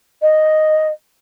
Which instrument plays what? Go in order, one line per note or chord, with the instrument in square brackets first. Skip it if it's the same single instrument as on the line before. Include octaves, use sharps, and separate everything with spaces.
[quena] D#5